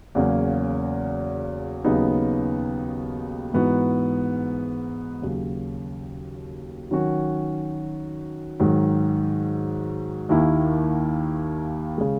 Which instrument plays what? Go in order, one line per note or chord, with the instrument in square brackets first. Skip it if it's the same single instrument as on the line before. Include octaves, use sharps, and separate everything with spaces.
[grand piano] E2 C#3 F#3 A#3 C#4
D#2 C#3 F#3 B3 D#4
G#2 E3 B3 D#4 F#4
D#2 C#3 F#3
D#3 F#3 C#4 F#4
G#2 D#3 F#3
D#2 D#3 A#3 E4
C#3 G#3